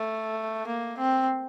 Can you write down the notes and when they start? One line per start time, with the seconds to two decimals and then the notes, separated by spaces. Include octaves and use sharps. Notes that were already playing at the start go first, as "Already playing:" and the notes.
Already playing: A3
0.67 A#3
0.98 C4